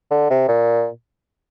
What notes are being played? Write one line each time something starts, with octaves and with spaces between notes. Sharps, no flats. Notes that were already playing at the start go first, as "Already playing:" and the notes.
D3
C3
A#2